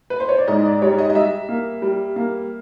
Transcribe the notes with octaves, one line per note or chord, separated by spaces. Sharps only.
B4
C5
C#5
D5
G#2 D#5
D5
G3 C#5
D#5
D#5
G3 E5
A#3
G3
A#3